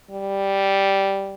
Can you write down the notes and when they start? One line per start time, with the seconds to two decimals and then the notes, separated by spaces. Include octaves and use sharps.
0.11 G3